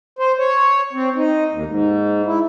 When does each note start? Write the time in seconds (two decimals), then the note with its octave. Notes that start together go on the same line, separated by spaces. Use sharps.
0.19 C5
0.38 C#5
0.93 C4
1.16 D#4
1.51 D#2
1.66 G#2
2.25 E4